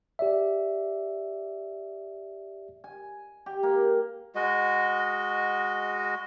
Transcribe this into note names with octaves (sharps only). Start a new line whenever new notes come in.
G4 D5 E5
G#5
G4
A#3
G#3 F#4 D#5